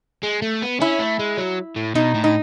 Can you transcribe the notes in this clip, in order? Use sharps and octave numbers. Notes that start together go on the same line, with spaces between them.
G#3
A3
B3
C#4 E4
A3
G#3
F#3
A2
B2 D#4
A2
D#4